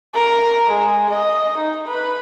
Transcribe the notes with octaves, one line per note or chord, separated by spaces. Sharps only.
A#4
G#3
D#5
D#4
B4